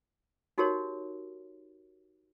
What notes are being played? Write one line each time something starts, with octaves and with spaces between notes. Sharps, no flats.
D#4 F#4 G4 A#4 C#5